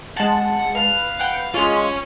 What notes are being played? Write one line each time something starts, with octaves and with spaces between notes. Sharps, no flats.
G#3 F#5 A5
B4 F5
F#5 G5
G#3 C#4 F4 G#4